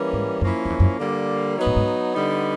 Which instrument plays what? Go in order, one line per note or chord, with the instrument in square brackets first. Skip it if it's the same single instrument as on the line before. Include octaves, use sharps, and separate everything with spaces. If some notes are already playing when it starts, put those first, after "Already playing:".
Already playing: [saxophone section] E3 G3 A#3 C#4
[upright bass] G#2
[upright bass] F#2 [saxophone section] F3 A#3 C#4 E4
[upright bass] F2
E2
F#2
[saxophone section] D3 G3 A#3
F#3 B3 D#4
[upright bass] A2
G#2
[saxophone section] D3 G3 B3 D#4